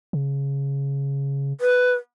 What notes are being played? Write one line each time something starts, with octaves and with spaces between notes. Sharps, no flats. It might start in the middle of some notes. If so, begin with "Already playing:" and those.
C#3
B4